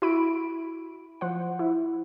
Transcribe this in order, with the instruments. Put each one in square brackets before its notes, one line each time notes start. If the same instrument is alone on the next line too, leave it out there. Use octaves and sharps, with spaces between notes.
[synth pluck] E4 F#4 B5 D7
F3 C5 F#5
E4